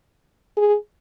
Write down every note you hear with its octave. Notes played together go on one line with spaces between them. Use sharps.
G#4